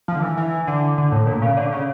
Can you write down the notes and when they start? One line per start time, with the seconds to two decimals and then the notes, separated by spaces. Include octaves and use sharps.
0.08 F3
0.16 D3
0.22 E3
0.37 E3
0.67 D3
0.98 D3
1.12 A2
1.27 A#2
1.42 C#3
1.57 D3
1.72 C#3